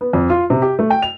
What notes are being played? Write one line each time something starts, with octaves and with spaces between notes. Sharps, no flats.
B3
F2
F4
C3
G4
A3
G5
F7